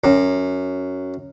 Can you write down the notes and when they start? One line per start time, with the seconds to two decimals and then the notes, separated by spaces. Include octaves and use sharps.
0.04 F#2